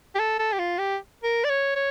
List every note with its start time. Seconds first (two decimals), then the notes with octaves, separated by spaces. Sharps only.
0.15 G4
0.19 A4
0.39 A4
0.53 G4
0.59 F4
0.79 G4
1.24 A#4
1.44 D5
1.49 C#5
1.76 C#5